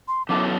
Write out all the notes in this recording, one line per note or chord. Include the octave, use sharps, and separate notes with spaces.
C6
F#2 F#3 B3 E4 A4 D6